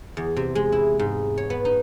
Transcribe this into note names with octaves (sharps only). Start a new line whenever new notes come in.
E2
C3
G#3
E4
G#2
C#5
B3
D#4